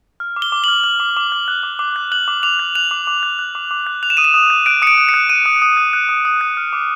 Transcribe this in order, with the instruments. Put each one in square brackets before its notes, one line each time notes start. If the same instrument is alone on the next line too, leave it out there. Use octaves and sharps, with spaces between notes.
[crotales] F6
D6
G7
D6
F#7
F6
F6
D6
D6
F6
F#6
D6
D6
F#6
F#6 F#7
D6
D6 F7
F#6
F#6 F7
D6
D6
F#6
F#6
D6
D6
F#6
F#6 F7
E7
D#6 D#7
E7
D#6
F#6
F#6 D7
D#6 C#7
D7
D#6
C#7
F#6
F#6 D#7
D#6
D#6
F#6
F#6
D#6
D#6
F#6
F6
D6